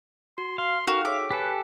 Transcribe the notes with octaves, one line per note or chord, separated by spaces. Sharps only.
F#4 C6
F5 C6
D#4 F#4 A4 A#4 F5 G5
G#4 C#5 E5 D6
G4 A4 B4 G5 G#5 F#6